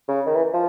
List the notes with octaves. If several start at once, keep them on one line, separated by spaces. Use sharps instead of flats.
C#3
D#3
E3
F3